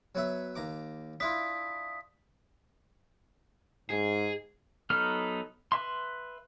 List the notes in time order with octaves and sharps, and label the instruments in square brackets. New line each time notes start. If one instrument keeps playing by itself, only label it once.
[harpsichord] F#3 B3 E5
D#2 A#5 D6
[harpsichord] D4 E4 F4 [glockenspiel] D#6 B6
[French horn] G#2 [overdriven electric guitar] G#4
[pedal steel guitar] F#3 B3 D#4 A4 F6
B4 E5 C6